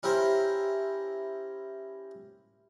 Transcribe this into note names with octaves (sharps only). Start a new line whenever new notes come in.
C#4 E4 G4 A#4 C5